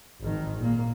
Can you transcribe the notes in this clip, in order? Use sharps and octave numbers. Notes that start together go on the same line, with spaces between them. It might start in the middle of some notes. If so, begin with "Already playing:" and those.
G#1 D#3
A#2 A#3